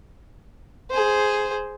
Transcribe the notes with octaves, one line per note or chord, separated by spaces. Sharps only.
G#4 C5